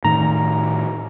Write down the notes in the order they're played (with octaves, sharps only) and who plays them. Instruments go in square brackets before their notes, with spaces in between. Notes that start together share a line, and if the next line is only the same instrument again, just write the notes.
[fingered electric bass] A2 D#3 [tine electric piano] A#5